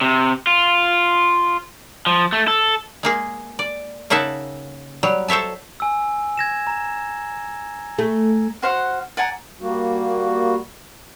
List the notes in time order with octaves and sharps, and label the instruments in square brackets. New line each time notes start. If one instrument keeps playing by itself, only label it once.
[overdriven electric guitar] C3
F4
F3
A3
A4
[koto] G#3 A#3 G#4
D5
C#3 A#3 D#4 E5 F#5 A5
F#3 G3
A4 C5 C#5 E5 A5
[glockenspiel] G#5 E6
G#6 A#6 E7
A#5
[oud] A3
[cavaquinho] F#4 C5 F5 F#5
D5 F#5 G#5 A#5
[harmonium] G3 A#3 F#4